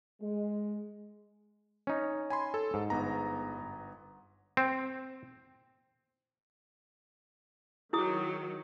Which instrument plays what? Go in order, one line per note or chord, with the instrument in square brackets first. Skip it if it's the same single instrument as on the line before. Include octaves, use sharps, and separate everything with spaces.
[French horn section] G#3
[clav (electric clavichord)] C#4 D#4
[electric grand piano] G#5 B5 C6
A4
[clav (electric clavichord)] G#2
[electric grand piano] G1 B3 A#5
[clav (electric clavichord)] C4
[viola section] D#3 F#3 [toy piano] E4 G#4 D#6